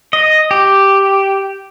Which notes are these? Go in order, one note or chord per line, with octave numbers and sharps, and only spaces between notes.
D#5
G4